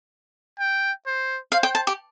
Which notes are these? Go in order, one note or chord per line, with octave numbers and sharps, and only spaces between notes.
G5
C5
C5 F5
G5
A5
G4